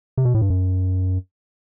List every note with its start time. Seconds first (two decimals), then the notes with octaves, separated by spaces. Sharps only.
0.17 C3
0.25 B2
0.34 A2
0.41 G2
0.50 F#2